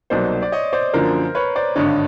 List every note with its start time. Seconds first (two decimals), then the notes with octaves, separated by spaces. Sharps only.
0.10 C2 B2 F#3 A#3 D#4 C5 D5
0.42 D5
0.52 C#5 D#5
0.73 C5 D5
0.94 F#2 D3 F3 A#3 A#4 C5
1.35 B4 C#5
1.56 C5 D5
1.76 G#1 G2 D3 C#5 D#5